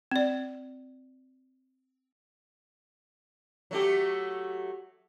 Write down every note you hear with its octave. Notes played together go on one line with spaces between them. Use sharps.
C4 D5
F#3 A3 G4